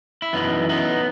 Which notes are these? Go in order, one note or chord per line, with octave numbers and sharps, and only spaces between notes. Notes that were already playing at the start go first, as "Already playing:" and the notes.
E4
F#2 E3 B3 D#4
B3 D#4